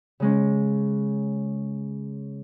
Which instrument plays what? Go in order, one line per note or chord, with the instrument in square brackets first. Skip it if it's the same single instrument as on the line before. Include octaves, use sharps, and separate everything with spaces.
[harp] C#3 G#3 C#4